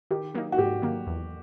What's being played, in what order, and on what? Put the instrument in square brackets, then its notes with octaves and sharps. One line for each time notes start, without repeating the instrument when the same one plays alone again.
[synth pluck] D#3 [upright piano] G4
[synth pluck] F#3 A#3 D#4
[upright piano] F#4
[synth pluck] G#2 [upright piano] G4
[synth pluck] D#3 F#3 A#3
E2